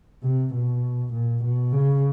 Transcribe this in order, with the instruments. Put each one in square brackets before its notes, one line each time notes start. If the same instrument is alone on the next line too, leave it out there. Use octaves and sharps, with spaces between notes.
[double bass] C3
B2
A#2
B2
C#3